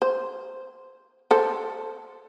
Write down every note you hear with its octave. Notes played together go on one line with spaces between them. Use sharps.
C5
A4 C5